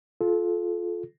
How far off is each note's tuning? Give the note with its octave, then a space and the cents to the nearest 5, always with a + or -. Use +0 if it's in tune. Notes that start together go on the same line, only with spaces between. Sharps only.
F4 +10 A4 -30